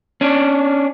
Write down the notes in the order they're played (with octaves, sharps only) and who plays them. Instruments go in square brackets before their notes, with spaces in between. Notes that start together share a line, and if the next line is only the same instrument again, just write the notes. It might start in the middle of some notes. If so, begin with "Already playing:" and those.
[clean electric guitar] C#4 D4